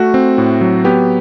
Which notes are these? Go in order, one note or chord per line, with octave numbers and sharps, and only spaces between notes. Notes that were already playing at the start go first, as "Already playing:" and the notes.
Already playing: A3 F#4
C4
A2
F#3
B3 G4